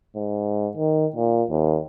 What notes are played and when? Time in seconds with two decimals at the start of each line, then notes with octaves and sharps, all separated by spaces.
0.15 G#2
0.77 D#3
1.16 A#2
1.50 D#2